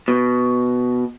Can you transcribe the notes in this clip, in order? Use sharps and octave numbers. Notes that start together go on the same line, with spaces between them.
B2